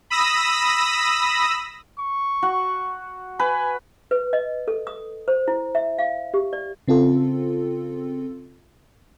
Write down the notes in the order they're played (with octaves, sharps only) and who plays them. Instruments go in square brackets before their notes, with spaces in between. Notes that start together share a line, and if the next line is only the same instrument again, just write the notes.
[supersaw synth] B5 D#6 E6 A#6
[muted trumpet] C#6
[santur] F#4
[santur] B4 [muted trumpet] G#5
[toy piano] B4
D#5
A4
D#6
C5
E4
E5
F5
G4
D5
[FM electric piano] C#3 C4 F4 A4